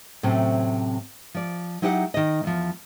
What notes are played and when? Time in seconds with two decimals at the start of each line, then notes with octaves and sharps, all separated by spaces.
0.23 A2 C3 F#3 A3 C4 C#4
1.34 F3 D5
1.82 F#3 D#4 E4 G4 E5 F#5
2.14 D#3 D#5
2.44 E2 F3